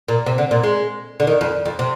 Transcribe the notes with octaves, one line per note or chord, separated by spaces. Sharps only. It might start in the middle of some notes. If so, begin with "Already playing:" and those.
A#2
C3
D3
A#2
G#3
D3
D#3
F2
F2
C3